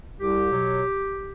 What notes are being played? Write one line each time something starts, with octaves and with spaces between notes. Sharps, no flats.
C2 G4
B2 F#3